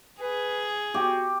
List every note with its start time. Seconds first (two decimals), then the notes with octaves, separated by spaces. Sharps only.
0.20 G#4 B4
0.94 F#4 G4